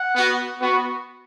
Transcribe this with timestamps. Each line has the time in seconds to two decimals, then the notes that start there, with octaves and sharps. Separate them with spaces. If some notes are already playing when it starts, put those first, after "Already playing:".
Already playing: F#5
0.14 B3 F#4
0.60 B3 F#4